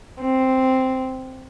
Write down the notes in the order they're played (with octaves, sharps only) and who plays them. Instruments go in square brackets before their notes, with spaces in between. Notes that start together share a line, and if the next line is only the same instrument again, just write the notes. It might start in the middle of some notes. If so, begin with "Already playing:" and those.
[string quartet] C4